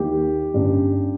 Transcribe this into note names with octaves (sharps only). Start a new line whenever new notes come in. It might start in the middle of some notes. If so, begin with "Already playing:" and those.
Already playing: D#2 D#3 A#3 D#4 G4
G1 G2 G3 C#4